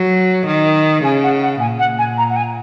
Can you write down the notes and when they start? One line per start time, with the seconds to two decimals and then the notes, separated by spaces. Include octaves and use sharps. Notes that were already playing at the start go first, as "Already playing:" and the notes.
Already playing: F#3
0.47 D#3
1.04 C#3 G#5
1.23 F#5
1.42 F#5
1.60 A#2 G#5
1.79 F#5
1.98 G#5
2.18 A#5
2.29 F#5
2.36 G#5